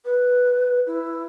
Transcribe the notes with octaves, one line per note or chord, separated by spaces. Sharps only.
B4
E4